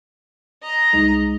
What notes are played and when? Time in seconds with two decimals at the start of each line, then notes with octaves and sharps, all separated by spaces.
0.63 D#5 A#5
0.93 C2 G#3 D#4